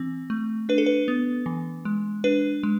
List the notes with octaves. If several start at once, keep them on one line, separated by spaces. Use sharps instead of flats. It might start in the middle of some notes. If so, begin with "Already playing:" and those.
Already playing: E3 C4
A3
D4 B4
A4
B4
B3
E3
G#3
D4 B4
G#3